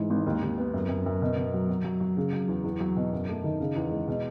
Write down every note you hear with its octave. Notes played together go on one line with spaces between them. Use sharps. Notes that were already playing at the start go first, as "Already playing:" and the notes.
Already playing: G#2 E3
G#1
D#2
D#2
B3
F#2
F#2
F#2
B2
B2
F#3
F#3
F#3
F#3
C#3
F#3
E2
E2
F#3
B2
F#2
A3
D#3
C#3
E2
G#3
B2